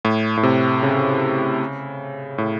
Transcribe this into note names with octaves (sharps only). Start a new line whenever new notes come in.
A2
A2
C3
C#3
A2